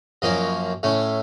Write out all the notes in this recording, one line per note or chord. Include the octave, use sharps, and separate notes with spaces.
F#2 F3 A#3 C#4 D#5
A2 A3 C#4